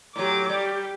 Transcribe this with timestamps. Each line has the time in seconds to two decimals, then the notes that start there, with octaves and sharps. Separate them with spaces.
0.16 A2 F#3 G4 D6
0.49 G3 G4